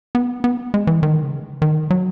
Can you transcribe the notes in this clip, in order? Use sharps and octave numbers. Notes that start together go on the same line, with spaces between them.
B3
B3
G#3
E3
D#3
C#3
D#3
F#3